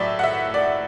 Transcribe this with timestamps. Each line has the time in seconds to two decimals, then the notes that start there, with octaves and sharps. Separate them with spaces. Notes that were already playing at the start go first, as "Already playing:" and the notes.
Already playing: A2 F#3 D5 E5
0.19 F#5
0.24 E5
0.54 D5